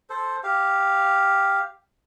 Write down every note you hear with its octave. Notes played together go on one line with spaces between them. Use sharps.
A4 C5
G4 F5